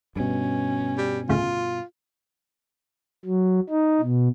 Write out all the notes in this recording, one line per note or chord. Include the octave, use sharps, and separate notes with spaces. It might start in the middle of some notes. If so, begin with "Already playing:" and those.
G2 B2 C#4
G3
D2 A2 C#3 F4
F#3
D#4
B2